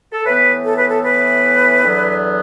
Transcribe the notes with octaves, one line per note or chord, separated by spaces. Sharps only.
A4
A2 E3 B3 B4
A4
B4
A4
B4
E2 D3 F#3 B3